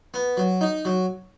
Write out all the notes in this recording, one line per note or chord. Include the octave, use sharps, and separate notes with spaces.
B3
F#3
D#4
F#3